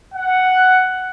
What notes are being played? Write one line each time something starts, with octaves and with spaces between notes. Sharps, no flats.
F#5